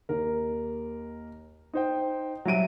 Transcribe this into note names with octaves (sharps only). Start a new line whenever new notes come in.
D#2 A#4
D#4 C5 G5
F#3 G3 E5 D7 D#7